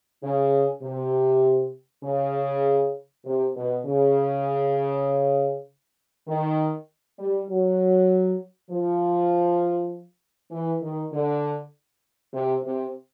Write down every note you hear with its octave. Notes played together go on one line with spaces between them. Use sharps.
C#3
C3
C#3
C3
B2
C#3
D#3
G3
F#3
F3
E3
D#3
D3
C3
C3